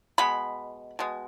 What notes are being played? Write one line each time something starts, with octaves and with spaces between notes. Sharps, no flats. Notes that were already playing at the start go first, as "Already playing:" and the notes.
B2 G#3 B3 B5
B2 G#3